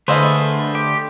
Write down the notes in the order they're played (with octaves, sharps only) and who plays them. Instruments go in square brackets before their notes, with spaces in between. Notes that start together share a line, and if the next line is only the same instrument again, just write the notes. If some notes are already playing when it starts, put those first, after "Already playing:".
[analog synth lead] D3 [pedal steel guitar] A3 [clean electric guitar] G#4 A4 B4 [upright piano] C5 D#5 F5
[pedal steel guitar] G4